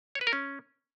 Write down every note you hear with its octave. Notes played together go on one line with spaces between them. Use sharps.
C#5
B4
A#4
C#4